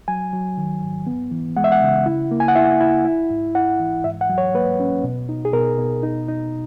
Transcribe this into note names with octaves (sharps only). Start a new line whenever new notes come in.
F#3 G#5
F#3
D#3
G#2
B3
E3
G#3 F#5
E5
F#5
C#3
E4
A#3
G#5
F#5
E4 E5
E4
E4
G#2
E4 F#5
E3
G#2 E5
F#5
F#3
C#5
A#3 B4
C#4
B2
D#4
G#4
B2 A#4
B2
D#4
D#4